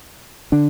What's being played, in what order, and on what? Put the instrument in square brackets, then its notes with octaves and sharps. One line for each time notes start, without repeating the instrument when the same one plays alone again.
[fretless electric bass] D3 D4